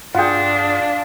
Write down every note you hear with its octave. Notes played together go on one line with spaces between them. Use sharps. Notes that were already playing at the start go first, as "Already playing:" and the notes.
G2 D4 F4 G#4 F#5 G5